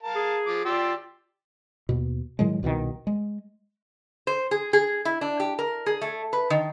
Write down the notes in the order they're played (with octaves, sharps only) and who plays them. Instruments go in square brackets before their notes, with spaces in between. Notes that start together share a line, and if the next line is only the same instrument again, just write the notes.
[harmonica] A#4 F5 A5
[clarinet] G#4
[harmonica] F3 D6
[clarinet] F4 [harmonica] G4 D5 E6
[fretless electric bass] D#2 B2
A2 D#3 F#3 G#3
C2 B2 D3 D#3
G#3
[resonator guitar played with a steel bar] C5
G#4
G#4
E4
D4
G4
A#4
G#4
A3
B4
D#3